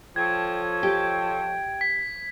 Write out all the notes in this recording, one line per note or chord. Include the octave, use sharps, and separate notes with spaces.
F3 A4 C#5 G5 G#6
G4 D#5 G5
B6